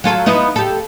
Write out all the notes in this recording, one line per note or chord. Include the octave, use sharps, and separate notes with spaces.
F#3 F4 A4
B3 D#4 E4
G4 A4